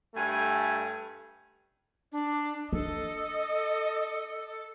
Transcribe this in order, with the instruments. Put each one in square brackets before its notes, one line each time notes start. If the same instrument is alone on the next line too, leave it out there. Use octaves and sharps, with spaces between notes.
[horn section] G2 A3 G#5
[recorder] D4
[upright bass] D4 [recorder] A4 [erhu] D#5